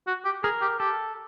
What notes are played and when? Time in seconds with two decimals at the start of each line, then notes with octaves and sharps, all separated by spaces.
0.07 F#4
0.25 G4
0.44 G#4 A#4
0.62 G4
0.79 G4 A4